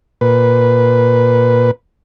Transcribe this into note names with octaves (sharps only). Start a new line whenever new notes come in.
A#2 B4